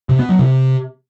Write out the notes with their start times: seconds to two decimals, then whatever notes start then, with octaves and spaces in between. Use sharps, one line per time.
0.09 C3
0.19 B3
0.29 F#3
0.39 C3